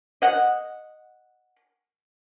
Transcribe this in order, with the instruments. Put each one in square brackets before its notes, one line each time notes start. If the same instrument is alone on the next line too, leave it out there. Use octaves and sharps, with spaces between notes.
[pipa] D#5 F#5